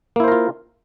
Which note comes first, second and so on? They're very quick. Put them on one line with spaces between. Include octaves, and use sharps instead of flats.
A#3 E4 C5 A#4 F4